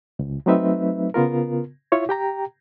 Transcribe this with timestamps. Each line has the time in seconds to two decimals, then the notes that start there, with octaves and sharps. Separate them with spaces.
0.19 C#2
0.46 F#3 A3 C4 D#4 B4 E5
1.14 C#3 B3 F4 A#4
1.92 E4 F4 C#5 E5
2.09 G4 G5 A#5